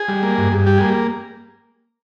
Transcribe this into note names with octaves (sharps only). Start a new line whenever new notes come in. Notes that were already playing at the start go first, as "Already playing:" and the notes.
Already playing: G#4
G3
A#3
G2
G2
G3 G4
A#3 G#4